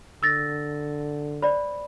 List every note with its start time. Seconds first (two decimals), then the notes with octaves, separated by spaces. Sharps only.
0.23 D3 E6 A6 A#6
1.42 C5 D5 B5